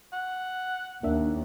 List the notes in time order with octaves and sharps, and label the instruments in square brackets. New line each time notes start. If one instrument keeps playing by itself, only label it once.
[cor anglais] F#5
[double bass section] D#2 [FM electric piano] A#3 D4 E5